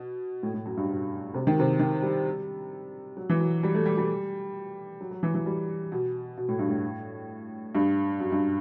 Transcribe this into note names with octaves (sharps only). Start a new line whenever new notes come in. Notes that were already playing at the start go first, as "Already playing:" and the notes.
Already playing: B2
A2
A2
F#2
G2
B2
C3
D#3
C3
D#3
G3
F#3
E3
F#3
G3
A3
G3
G3
F#3
F#3
E3
E3
G3
B2
B2
A2
G2
A2
G2
F#2
G2